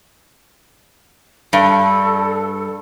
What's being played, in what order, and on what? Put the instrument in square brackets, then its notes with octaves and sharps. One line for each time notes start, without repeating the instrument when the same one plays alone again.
[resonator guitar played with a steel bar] G2 [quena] A4